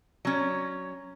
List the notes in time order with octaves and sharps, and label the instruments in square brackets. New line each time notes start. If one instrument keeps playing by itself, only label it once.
[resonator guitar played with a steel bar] F#3 C#4